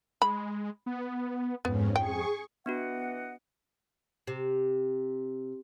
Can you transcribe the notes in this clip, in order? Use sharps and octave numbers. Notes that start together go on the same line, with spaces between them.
G#3 B5
B3
F2 G#2 B3 C#4
G#4 G5 C#6
E3 B3 D4 F#4 D#5 F#5
C3